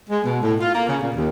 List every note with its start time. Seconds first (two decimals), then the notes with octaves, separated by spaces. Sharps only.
0.10 G#3
0.24 B2
0.43 A2
0.60 F4
0.74 A#3
0.88 C#3
1.01 A#2
1.15 D#2